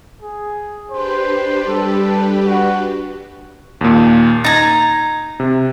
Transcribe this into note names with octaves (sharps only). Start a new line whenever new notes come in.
G#4
D4 G4 B4 C5
G3 A4
F#4
D#2 A#2
D#4 A#5 G#6 A6
C3